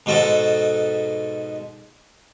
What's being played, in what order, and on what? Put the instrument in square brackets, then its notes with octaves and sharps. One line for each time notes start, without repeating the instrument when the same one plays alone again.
[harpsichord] G#2 B2 F#4 A4 F#5